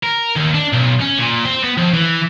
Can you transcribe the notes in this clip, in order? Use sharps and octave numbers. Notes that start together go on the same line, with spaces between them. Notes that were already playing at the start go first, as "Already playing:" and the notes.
A#4
D#2
D4
B1
C#4
A#2
C4
B3
F2
E3